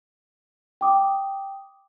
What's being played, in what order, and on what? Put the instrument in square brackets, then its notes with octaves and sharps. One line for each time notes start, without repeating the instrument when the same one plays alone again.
[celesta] G5 D6 D#6